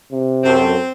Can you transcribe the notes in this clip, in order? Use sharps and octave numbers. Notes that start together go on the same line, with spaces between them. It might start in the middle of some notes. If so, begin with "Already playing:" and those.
C3
F#2 C4 A4